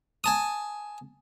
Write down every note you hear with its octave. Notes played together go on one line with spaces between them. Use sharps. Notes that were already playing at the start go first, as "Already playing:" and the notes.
G#5 A5 D#6